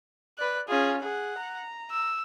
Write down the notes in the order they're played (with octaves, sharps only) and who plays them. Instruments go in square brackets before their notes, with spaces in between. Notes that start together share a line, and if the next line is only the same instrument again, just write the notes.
[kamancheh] B4 D5 [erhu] F#6
[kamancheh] C#4 F4 [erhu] G#4
[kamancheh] G#4 [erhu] F#5
[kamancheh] A#5
[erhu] E6